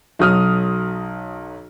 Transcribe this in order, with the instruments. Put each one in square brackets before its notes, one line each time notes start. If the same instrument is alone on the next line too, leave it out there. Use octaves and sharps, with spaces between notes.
[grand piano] B1 F#3 D#6 F6